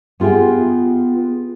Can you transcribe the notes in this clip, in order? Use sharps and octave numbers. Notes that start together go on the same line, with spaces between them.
B3 F4 G4 G#4 G5